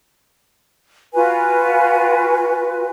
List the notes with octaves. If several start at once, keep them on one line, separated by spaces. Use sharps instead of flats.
F4 F#4 B4 G#5